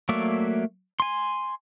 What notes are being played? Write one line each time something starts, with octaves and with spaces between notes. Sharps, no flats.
F#3 A3 A#3 D5 E5
G#5 C6